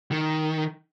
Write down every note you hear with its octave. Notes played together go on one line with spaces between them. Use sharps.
D#3